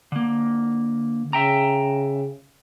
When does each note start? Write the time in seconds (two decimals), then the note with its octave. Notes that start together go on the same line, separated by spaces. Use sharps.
0.12 D3 A#3
1.33 C#3 E5 G5 A#5